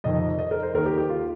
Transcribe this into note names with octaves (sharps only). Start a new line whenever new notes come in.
F2 C3 D#3 D#5
D#5
A#4
C5
D#2 D#3 A#4
G4
G4
F4